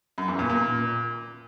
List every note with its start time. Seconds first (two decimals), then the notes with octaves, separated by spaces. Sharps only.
0.18 F#2
0.28 E2
0.39 A#2
0.49 A#2